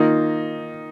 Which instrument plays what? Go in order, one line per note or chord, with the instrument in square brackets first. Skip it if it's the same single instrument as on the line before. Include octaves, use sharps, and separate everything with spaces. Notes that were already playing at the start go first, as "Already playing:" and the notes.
Already playing: [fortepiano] D#3 A#3 F4 [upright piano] D#4